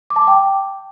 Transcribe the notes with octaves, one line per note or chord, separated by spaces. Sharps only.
D6
A5
D6
G5